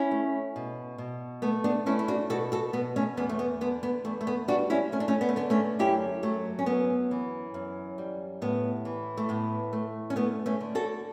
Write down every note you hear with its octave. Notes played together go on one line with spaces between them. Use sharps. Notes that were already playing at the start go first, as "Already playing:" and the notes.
Already playing: C#4 E4
A3
B2
B2
A3 B3
B3 D4
A3 C#4 E4
E4
D4 F#4
B2 F#4 A4
F#4 A4
B2 B3
A3 C#4
E2 B3
A3
B3
D3 B3
B3
E2 A3
A3
B3
G3 D4 F#4
C#4 E4
A3 C#4
D4
A3 C#4
B3
A3
D3 B3
A3 C#4
F#2 E4 G4
F#3 A3
C#4
F#2 B3
E3
F#2
G3
A2 B3
E3
A3
A2 B3
A3
C#4
A3 B3
A3 C#4
D3
F#4 A4